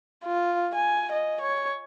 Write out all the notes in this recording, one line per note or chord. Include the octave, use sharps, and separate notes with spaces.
F4
G#5
D#5
C#5